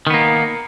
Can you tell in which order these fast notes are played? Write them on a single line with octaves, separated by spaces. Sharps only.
D#3 B3 A#3